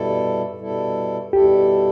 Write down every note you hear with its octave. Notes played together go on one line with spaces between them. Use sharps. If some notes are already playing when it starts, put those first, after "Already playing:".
Already playing: B2 G3 E4 A4
B2 G3 E4 A4
B2 G3 E4 G4 A4